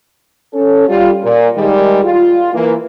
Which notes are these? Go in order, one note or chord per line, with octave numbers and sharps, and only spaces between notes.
C#4 A4
G3 F4
A#2
D#3 G3 G#3
F4
E3 A#3